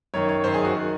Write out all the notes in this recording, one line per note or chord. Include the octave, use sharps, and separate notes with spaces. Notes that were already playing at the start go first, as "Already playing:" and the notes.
F#2 D#3 C#5
C#5
F#2 D#3 C5
G#4
F#4
D#3